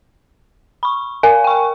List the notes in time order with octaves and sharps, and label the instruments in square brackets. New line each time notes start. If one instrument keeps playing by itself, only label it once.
[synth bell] B5 C#6
[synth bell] A#4 F5 [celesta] G#5
[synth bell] G5 C#6